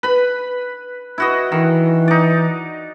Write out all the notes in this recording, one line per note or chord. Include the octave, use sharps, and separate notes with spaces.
B4 B5
E4 F#4 D#5
D#3 E3
D#4 D5